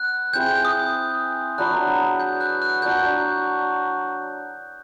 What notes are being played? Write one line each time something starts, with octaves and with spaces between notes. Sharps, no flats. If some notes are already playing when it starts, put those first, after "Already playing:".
Already playing: B3 F#6
C4 E4 G#4 G6
D#6
F#3 B3 D4 F#6
G6
F#6
F#6
A#3 D4 F#4 G6